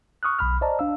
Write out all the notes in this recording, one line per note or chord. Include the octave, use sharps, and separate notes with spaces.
C#6 D#6 F6 F#6
B1 B5 F6
C5 D5 D#5 A5 A#5
D4 F5 E6